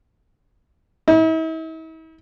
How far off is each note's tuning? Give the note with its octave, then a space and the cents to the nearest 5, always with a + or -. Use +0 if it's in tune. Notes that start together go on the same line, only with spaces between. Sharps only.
E4 -45